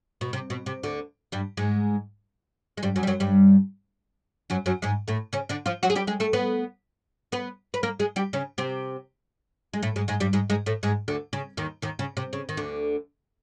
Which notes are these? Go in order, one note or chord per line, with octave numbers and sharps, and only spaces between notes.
B2
C3
B2
C3
D2 D3
G2 G3
G#2 G#3
G#3
G2 G3
F#2 F#3
G3
F#2 F#3
G2 G3
F#2 F#3
F#2 F#3
G#2 G#3
A2 A3
C#3 C#4
D3 D4
F3 F4
F#3 F#4
G#4
G3 G4
G#3 G#4
A3 A4
B3 B4
B3 B4
B4
A#3 A#4
G#3 G#4
G3 G4
C#3 C#4
C3 C4
G#3
A2 A3
G#2 G#3
G#2 G#3
G2 G3
G#2 G#3
G#2 G#3
A2 A3
G#2 G#3
D2 D3
C#3
D#2 D#3
D#2 D#3
C#3
C3
C#3
D#3
D2 D3